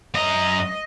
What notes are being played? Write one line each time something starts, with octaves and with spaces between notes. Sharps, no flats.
F#2 D#5 A#5